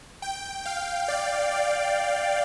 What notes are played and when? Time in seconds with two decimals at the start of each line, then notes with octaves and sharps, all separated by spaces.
0.22 G5
0.65 F5
1.08 D5
1.51 D5